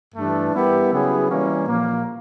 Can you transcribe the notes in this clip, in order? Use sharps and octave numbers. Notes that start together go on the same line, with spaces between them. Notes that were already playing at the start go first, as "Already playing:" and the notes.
G2 E3 A3 D4
G3 B3 E4 G4 A#4
C#3 F#3 B3 E4 G#4
E3 G3 A#3 C#4
A#2 F3 A#3